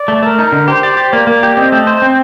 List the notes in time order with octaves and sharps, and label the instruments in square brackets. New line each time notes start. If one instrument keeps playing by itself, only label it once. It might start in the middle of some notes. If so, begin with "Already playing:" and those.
Already playing: [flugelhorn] D5
[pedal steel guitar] A3
[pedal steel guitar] A3 [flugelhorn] A#4
[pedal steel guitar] D#4
D3
[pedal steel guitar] G4 [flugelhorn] C5
[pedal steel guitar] D5
G4
[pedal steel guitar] A#3 [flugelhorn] D5
[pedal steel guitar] A#3
G4
[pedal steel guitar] C4 [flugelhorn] D#5
[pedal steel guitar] A3
C5
C4